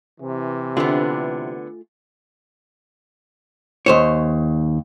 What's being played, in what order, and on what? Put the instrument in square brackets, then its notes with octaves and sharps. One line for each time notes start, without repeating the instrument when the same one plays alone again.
[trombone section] C3 E3
[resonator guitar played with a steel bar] D3 B3 [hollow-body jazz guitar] A3 F4 G#4
[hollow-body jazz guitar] D#2 C5 C#5